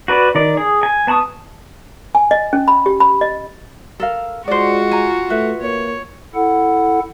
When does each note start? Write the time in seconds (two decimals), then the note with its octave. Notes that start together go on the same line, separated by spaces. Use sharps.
0.08 F#4 B4 D5
0.35 D#3 D5
0.57 G#4
0.83 G#5
1.07 B3 A5 B5 C#6 D#6
2.15 G#5
2.31 D#5
2.53 C#4
2.68 B5
2.86 G4
3.00 B5
3.21 D#5
4.00 A4 A#4 F5
4.48 G#3 F4 F#4 C5 D5
4.91 G#5 A#5
5.30 A3 B4 E5
5.61 A#3 C#5
6.35 E4 A4 F#5